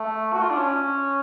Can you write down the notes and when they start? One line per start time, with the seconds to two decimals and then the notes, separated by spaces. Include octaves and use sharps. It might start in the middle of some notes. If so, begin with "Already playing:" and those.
Already playing: A3
0.33 F#4
0.41 F4
0.51 D4
0.58 C#4